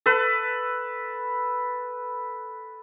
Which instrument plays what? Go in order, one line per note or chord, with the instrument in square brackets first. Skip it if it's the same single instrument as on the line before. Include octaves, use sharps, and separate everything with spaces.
[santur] A4 B4